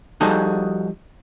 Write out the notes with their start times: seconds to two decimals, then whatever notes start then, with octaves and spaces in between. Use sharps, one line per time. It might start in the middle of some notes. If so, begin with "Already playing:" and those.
0.21 F3 G3 D#4 F#4 G#4 A4